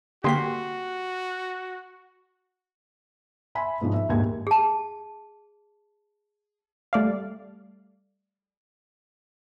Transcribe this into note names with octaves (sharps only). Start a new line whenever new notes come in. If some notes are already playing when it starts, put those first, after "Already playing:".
D3 A#3 F#4 G4 C6 B6
E5 G#5 B5 C6
G#2 B2 F3 D#4
E5
A#1 D#2 G#2 G4 G#4 G#6
G#4 A5
G3 A3 D5 F5